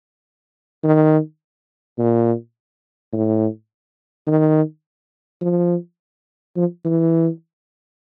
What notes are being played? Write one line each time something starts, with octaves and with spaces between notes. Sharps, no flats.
D#3
A#2
A2
D#3
F3
F3
E3